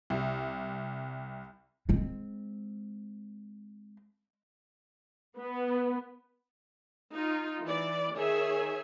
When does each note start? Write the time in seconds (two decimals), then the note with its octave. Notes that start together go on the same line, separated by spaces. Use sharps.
0.10 C2
1.89 G#3 C4
5.39 B3
7.13 D#4 F4
7.64 E3 D5
8.15 D#3 G#4 C#5 E5 G#5